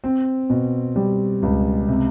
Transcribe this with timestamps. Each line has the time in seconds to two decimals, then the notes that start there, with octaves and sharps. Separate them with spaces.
0.04 C4
0.50 B2
0.96 G3
1.42 C#2
1.89 C3